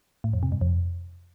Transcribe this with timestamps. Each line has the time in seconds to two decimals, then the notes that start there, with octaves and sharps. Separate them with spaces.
0.24 A2
0.33 F2
0.43 C3
0.52 G2
0.61 F2